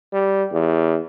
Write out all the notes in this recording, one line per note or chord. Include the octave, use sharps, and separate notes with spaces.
G3
E2